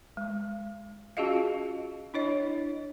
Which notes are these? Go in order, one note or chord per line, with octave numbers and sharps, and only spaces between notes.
G#3
C#4 F4 F#4 G#4 D#5 F5
D4 E4 C#5 D#5